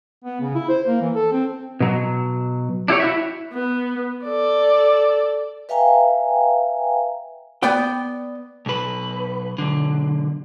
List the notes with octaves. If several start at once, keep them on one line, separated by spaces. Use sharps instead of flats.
B3
C#3
E4
C5
A#3
E3
A4
C4
B2 F#3
D4 E4 G4 C#5
E4 F#4 E5
B3
A4 D5
B4 E5 F5 G5 G#5 A#5
B3 D5 G5
B1 B4
B1 D3